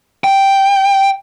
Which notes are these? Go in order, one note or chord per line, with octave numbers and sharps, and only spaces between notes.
G5